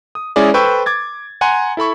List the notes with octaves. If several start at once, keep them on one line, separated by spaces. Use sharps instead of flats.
D#6
G#3 C#4 E4 G#4 D5
A4 B4 C5 G5 C#6 E6
D6 G#6 A6
F#5 G#5 A#5 C6
E4 A4 B5 C#6